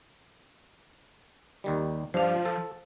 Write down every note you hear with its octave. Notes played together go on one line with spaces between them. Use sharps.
D#2 D#3 G3
G2 F3 D4 C5 F5
A4